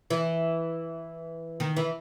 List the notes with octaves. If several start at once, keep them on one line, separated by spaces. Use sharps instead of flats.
E3
D#3
E3